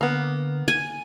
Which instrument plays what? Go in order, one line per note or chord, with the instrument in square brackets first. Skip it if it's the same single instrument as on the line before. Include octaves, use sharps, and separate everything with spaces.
[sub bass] D3 [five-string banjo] A#3 B3
[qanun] G#5